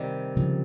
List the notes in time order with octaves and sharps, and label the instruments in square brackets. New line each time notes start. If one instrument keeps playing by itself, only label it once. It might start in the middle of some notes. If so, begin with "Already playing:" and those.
Already playing: [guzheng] C3 D#3 G3
[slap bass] C#3 F3 G#3